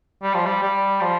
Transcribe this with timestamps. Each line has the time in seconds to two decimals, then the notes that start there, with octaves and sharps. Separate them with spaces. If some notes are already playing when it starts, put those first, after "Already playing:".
0.23 G3
0.34 F3
0.46 G3
0.63 G3
1.01 F3